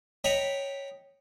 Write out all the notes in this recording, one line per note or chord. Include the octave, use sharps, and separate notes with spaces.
C#5 D#5 G5 A#5 B5